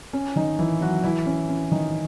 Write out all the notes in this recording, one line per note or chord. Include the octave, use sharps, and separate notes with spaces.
C#4
D#3 D#4
E3 E4
F#3 F#4
E3 E4
C#4
C#4
D#3 D#4